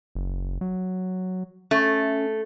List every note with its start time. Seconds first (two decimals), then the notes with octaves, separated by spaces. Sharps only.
0.15 F#1
0.61 F#3
1.71 A3 C#4